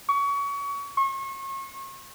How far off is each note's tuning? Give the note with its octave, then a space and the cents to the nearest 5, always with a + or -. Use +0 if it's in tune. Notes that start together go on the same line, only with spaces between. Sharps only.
C#6 +30
C#6 -35